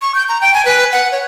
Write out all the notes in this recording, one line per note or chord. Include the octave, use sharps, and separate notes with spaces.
C#6
G6
A#5
G5
G#5
B4
F#5
C#5